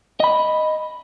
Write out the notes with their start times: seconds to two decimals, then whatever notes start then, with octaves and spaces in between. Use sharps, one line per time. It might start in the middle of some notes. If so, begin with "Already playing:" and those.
0.20 D#5 B5